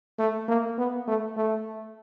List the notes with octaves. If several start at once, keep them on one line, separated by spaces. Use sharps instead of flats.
A3
A#3
B3
A3
A3